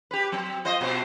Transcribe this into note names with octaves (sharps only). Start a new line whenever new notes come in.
G4 B4
F#3 C4
F4 C5 D#5
B2 F#4 C5